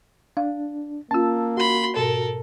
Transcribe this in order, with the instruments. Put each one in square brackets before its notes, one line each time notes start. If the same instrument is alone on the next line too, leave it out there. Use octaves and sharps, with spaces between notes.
[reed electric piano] D4 [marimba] F5
[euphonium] A#3 [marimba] C#4 F4 [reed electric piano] A5 E6
[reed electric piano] F#4 [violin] B5 C6
[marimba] G#2 B2 [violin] A4 A#4